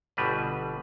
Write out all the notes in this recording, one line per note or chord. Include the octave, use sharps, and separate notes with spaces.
G1 B2 G3 B4